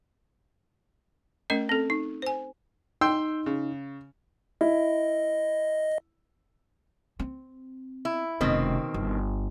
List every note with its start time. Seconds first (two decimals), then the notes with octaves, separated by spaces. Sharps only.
1.50 A3 C#4 A#4 D#5
1.69 C4 A4
1.90 D#4
2.22 C5 G#5
3.01 D#4 G5 C6 E6
3.46 C#3
4.61 E4 D#5
7.19 C4
8.05 E4
8.41 F1 B2 D#3 C4 C#4
8.94 G1